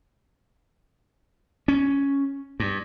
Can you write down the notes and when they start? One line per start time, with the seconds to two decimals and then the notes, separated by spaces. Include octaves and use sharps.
1.68 C#4
2.60 G2